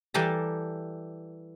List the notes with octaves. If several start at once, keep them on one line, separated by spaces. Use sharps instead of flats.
E3 G3 G4 A4 A#5